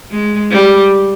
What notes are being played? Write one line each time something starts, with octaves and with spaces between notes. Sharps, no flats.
G#3
G3